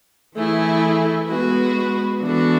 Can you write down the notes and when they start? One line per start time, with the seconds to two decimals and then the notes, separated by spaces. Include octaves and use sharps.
0.36 E3 A3 E4 G#4
1.28 G#3 B3 F#4 B4
2.21 E3 B3 D4 F#4 A4